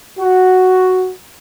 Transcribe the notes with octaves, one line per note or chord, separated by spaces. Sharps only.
F#4